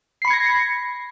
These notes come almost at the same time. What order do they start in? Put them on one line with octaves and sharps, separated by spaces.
C7 B5 C#7 G#6 A#6